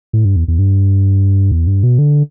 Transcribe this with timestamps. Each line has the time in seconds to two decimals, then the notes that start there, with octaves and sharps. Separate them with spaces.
0.13 A2
0.25 G2
0.36 E2
0.48 E2
0.59 G2
1.51 E2
1.67 G2
1.83 B2
1.99 D3